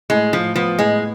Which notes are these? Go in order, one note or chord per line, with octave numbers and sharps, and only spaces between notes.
A2 G#3
A2 F3
F3 B3
A2 G#3